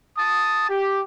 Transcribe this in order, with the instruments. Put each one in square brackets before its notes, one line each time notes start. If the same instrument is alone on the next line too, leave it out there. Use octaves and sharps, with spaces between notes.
[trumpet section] A5 D#6
G4